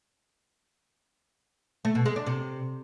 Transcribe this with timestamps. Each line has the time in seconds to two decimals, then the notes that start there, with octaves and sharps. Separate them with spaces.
1.85 A3
1.95 B2
2.06 G#3
2.16 D4
2.26 C3